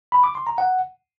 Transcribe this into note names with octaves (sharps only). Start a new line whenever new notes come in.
B5
D6
C6
A#5
F#5